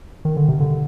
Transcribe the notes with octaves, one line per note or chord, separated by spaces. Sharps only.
D#3
D3
C3
D3